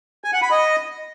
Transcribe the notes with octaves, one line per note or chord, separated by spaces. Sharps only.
G#5
F#5
B5
D#5